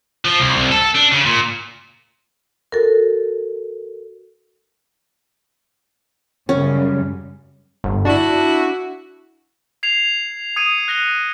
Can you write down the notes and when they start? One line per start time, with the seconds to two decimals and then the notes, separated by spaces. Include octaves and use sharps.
0.25 F3
0.40 C2
0.56 C2
0.72 A4
0.95 D4
1.12 C#3
1.26 A#2
2.72 F#4 A4 A#4
6.49 F#2 C#3 G3 C#4
7.84 G1
8.05 D4 E4 F#4
9.83 G#6 C7 C#7 F7
10.56 D#6 G#6 C#7 D#7
10.88 F#6 A#6 C#7 G7